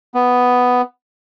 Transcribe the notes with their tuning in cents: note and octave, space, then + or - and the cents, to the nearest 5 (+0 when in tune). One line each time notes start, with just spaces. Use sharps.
B3 +5